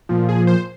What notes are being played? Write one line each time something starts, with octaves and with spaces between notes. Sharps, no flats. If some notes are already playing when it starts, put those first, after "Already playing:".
A#2 F3
G#4
C5